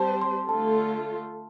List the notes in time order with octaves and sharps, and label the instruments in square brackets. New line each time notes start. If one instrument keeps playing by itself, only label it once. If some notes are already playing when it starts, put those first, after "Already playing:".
Already playing: [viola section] G3 C4 G4 C5 [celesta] A5 C6
[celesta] C6
[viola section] D3 A3 F4 A4 [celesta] A5